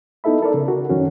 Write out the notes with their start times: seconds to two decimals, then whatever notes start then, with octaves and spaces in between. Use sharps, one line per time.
0.24 B3 D#4 E4 A4 E5 B5
0.42 A4 A#4 D5
0.54 C#3
0.68 F#4 A#4
0.90 F#2 D#3 C#4 F#4